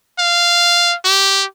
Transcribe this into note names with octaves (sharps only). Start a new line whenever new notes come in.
F5
G4